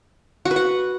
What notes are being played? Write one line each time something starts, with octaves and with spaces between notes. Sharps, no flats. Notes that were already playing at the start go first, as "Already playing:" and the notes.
F#4
B4
F#5